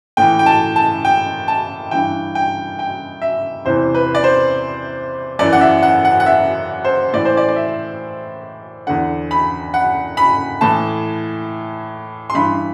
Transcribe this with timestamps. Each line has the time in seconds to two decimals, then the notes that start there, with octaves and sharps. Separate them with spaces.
0.17 A2 E3 G5
0.39 G5
0.46 A5
0.76 A5
1.05 G5
1.48 A5
1.91 G2 E3 G5
2.35 G5
2.79 G5
3.22 E5
3.65 E2 C3 E3 C5
3.94 B4
4.15 D5
4.24 C5
5.39 F#2 E3 D5
5.53 F#5
5.61 E5
5.83 F#5
6.05 F#5
6.20 F#5
6.26 E5
6.85 C5
7.13 A2 E3 D5
7.25 C5
7.37 D5
7.49 D5
7.56 E5
8.87 E2 D3 F#5
9.31 B5
9.74 F#5
10.17 B5
10.61 A2 E3 A5
12.30 C6
12.35 G2 E3 B5